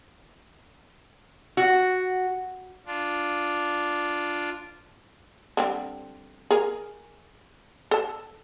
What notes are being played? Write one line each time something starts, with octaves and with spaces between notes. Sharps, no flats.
F#4
D4 F4
D3 G3 C4
G#4 A#4
A4 A5